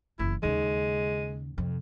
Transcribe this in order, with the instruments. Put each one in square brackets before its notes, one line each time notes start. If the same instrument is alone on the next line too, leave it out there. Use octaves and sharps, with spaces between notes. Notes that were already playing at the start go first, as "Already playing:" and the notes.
[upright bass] F#1 E2 [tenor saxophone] E4
[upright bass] D#2 C#3 [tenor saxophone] G#3
[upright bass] F2 C3